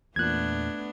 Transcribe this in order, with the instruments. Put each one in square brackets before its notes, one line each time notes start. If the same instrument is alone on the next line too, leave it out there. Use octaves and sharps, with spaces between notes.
[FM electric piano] E2 A#2 [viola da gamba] A3 B3 D4 [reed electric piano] F#6 G#6